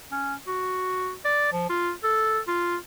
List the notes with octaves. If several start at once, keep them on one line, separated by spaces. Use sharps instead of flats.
C#4
F#4
D5
F3
F4
A4
F4